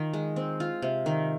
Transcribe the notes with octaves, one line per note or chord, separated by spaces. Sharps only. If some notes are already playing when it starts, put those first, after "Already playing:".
Already playing: D#3 F4
G#3
C4
F4
C3
D#3